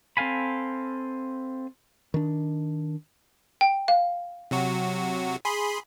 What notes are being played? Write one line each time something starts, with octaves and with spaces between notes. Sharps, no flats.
C4 A4 F5 G#5 B5
D#3 D4
G5
F5
C3 F#3 F#4
G#4 B5 C6